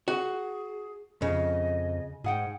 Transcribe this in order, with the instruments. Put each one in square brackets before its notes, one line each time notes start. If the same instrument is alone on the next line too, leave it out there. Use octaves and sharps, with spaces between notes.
[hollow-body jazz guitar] F#4 [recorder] G#4
[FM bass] F2 [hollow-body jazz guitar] C#3 [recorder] D#5
[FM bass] G#2 [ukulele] G#4 F#5 G5